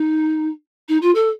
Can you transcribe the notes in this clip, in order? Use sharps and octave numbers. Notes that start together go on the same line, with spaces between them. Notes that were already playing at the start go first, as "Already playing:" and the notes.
Already playing: D#4
D#4
F4
A4